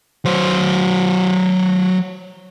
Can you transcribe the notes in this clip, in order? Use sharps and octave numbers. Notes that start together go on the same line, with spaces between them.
F#3 C5